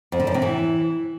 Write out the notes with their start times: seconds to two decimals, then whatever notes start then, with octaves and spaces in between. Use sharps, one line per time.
0.12 F2
0.20 D3
0.27 F#2
0.34 C3
0.42 E3